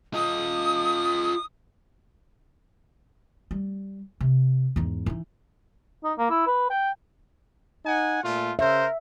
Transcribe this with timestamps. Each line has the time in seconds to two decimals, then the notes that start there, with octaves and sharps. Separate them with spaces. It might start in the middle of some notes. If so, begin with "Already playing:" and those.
0.14 F4 D#5 D#6
3.51 G3
4.21 C3
4.76 E2 G#2
5.06 E3 D#4
6.04 D#4
6.18 A#3
6.30 E4
6.47 B4
6.70 G5
7.85 D#4 F#5 G#5
8.23 A#2 A3 F4
8.59 C#3 A#4 C5 E5